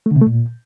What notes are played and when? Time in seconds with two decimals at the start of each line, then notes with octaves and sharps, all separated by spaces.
0.06 A3
0.11 D3
0.16 C3
0.21 A3
0.26 A#2